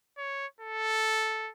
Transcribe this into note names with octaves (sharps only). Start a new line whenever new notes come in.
C#5
A4